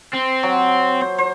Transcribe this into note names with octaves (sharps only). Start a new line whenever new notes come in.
C4
F#3
C5
C5